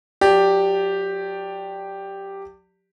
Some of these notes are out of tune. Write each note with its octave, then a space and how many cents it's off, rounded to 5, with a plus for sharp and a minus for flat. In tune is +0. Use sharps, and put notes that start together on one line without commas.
F#3 -40 G4 +0 D5 +0